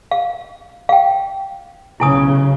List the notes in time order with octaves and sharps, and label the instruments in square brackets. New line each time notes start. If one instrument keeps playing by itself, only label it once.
[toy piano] F5
F5 G5
[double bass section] B1 C#3 [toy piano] E4 G#5 D#6